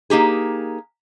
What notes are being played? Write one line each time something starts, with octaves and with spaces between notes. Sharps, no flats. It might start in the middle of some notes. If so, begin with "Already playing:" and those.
A#3 D#4 G4 G#4